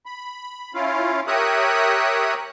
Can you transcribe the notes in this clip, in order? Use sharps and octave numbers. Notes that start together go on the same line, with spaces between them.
B5
C#4 E4 F4 F5
G4 A#4 C#5 E5 D#6 F#6